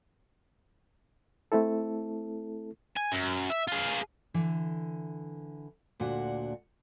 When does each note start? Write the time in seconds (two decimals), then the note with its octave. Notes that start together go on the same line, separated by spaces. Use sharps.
1.52 A3 C4 E4 A4
2.97 G#5
3.12 F#2
3.50 E5
3.68 F4 G#4
4.34 D3 E3
6.00 D2 A#2 D4 F#4 F#5